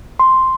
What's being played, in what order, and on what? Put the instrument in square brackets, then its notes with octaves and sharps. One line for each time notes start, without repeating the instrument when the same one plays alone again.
[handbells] C6